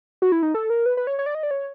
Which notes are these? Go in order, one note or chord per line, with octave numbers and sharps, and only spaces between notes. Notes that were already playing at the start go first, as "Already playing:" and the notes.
F#4
E4
D#4
A4
A#4
B4
B4
C#5
C#5
D5
D#5
D5
C#5